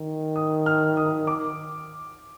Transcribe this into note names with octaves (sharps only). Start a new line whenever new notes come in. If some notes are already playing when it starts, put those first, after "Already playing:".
Already playing: D#3
D#6
F6
D#6
D6